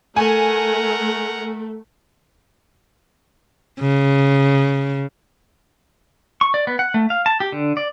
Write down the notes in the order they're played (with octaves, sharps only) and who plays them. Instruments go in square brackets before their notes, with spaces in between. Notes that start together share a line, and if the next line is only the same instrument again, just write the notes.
[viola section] A3 [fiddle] A#4 F#5 [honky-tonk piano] G#5
[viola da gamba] C#3
[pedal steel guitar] C#6
D5
B3
F#5
A3
F5
A5
G4
D3
D5